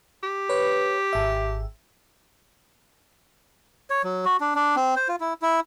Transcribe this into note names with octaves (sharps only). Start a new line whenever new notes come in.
G4
B4 C#5
G#1 E5
C#5
F#3
F#4
D4
D4
C4
C5
F4
E4
E4